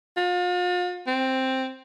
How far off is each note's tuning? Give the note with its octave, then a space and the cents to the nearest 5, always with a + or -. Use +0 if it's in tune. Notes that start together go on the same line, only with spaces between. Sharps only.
F4 +40
C4 +5